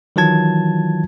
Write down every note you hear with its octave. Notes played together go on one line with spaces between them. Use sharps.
D#3 E3 F#3 F4 A5 G#6